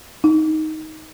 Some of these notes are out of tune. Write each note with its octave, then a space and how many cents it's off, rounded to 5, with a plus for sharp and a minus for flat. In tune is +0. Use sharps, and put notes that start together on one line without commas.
D#4 +10